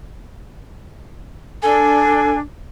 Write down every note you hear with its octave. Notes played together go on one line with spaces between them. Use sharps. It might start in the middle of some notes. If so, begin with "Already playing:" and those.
D4 A4 G#5